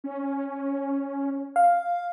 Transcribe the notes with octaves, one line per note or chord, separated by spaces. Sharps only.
C#4
F5